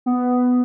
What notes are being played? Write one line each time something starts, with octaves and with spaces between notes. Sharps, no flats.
B3